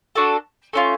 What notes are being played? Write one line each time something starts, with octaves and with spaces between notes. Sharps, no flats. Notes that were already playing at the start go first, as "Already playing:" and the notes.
D4 F#4 A4
A3 C#4 F4